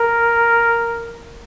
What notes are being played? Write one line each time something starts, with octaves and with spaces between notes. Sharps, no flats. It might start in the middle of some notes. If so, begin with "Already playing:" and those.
Already playing: A#4